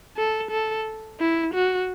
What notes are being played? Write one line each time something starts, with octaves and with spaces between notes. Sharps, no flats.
A4
A4
E4
F#4